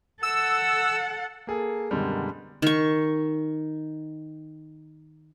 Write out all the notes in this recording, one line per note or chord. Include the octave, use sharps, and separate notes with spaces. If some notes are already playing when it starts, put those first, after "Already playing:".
A4 F#5 E6
A#3 G#4 A4
F#2 B2 D3 D#3 G3 G#3
D#3 C#6